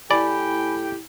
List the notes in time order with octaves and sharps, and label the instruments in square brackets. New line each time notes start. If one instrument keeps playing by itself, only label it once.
[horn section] A2 G4 G5 [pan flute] E4 [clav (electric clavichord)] D5 [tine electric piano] G#5 B5